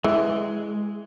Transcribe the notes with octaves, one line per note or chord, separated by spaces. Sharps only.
E3 G#3